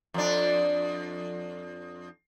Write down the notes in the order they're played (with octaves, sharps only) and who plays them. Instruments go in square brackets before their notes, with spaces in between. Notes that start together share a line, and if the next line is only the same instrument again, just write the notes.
[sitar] F2 D4